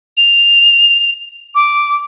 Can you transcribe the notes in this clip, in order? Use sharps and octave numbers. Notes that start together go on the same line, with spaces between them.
F7
D6